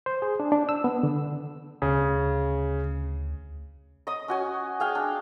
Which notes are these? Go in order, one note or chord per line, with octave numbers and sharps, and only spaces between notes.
C5
G#4
D4
D4
E6
B3
D3
D2 C#3
D#5 D#6
C#4 F#4 G#5
G#4 F5 G5
D4